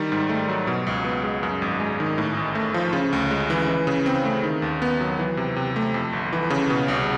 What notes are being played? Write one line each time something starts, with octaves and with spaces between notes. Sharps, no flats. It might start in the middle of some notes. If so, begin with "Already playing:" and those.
Already playing: D#3 G3
G#2
A3
F#3
B2
C#2
B3
G#3
F#2
G#1
G#3
D#3
A2
A1
A3
F3
C#3
D2
G#3
E3
E3
C#3
C4
A3
D#3
D#2
B3
F#3
E3
C3
C3
A3
F2
G1
E3
C#3
B2
C2